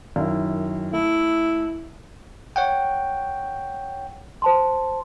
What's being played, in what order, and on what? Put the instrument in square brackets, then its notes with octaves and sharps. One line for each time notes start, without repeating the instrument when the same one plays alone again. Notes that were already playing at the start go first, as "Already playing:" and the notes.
[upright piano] F#2 D#3 E4
[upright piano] A3 [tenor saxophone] E4
[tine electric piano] C#5 F#5 G5
[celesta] C5 A5 C6